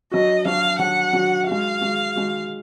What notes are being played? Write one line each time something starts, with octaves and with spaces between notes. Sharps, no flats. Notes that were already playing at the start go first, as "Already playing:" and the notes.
F#3 D4 F#4 D#5
F#3 D4 F#4 F5
F#3 D4 F#4 F#5
F#3 D4 F#4
G#3 D#4 F#4 F5
G#3 D#4 F#4
G#3 D#4 F#4